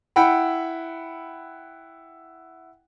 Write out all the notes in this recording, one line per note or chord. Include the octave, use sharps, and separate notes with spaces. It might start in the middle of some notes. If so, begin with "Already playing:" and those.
E4 F#5 G5 B5